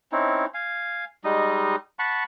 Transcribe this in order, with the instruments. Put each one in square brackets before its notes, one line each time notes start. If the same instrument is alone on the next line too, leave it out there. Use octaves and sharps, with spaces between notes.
[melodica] C4 C#4 D#4 E4
F5 G#5
G3 G#3 D#4 D#5
F#5 A5 B5 C#6